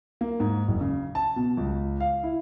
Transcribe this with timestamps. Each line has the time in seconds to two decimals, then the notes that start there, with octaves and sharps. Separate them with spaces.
0.21 A#3
0.40 G#2
0.68 F#1
0.81 C#3
1.15 A5
1.36 B2
1.57 C#2
2.00 F5
2.23 E4